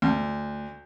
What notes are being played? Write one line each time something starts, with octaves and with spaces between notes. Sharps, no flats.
D2